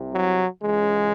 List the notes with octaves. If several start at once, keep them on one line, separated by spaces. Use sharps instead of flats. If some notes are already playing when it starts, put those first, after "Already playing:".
Already playing: C2 C3
F#3
C#2 C#3 E3 G#3